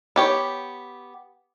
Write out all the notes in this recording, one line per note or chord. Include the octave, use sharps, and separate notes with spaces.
B3 G4 C#5